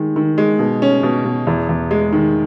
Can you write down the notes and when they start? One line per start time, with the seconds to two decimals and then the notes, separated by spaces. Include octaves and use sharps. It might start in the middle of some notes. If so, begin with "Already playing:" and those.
Already playing: D#3 G#3
0.16 D#3
0.38 G#3
0.59 B2
0.82 C#4
1.03 B2
1.25 B2
1.47 E2
1.69 E2
1.91 G#3
2.13 D#3